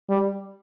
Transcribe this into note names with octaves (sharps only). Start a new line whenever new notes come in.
G3